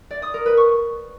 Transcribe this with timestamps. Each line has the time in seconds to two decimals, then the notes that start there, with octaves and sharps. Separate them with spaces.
0.11 D5
0.22 D#6
0.34 A#4
0.46 B4
0.57 C#6